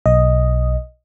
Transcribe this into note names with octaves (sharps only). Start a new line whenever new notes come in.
B1 D#5